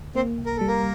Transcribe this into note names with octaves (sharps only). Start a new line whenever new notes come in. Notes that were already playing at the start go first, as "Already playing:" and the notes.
Already playing: D2
A#3 C4 C5
C2
A#4
G3 A4
A#3 A#4